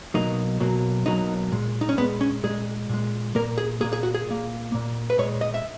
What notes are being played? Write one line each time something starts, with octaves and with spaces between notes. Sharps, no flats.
B1 B2 F#3 A#3 D#4
B1 B2 F#3 A#3
B1 B2 F#3 A#3 D#4
A#2 G#3
D#4
C#4
A#2 G#3 B3
C#4
A#2 G#3 G#4
A#2 G#3
A#2 A#3 A#4
G#4
A#2 A#3 G#4
G#4
F#4
G#4
A#2 A#3
A#2 A#3
B4
A#2 G#3 C#5
D#5
E5